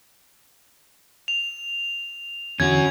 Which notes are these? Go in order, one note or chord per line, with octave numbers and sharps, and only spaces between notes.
F7
E2 D3 C#4 F#4 G#6